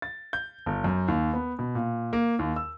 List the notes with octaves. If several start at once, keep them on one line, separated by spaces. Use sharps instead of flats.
A6
G6
G1
F#2
D#2
B3
B2
A#2
A#3
D#2
E6